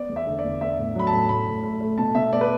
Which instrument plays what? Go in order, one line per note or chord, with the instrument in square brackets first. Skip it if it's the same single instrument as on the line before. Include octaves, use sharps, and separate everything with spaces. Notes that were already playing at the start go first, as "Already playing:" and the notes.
Already playing: [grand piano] B3 D5
E2
E5
D3
D5
E2
B3 E5
A2
F#3 B5
A5
A2
A2 B5
A2
A3
A3
B2 A5
B2 E5
B3 D5
B4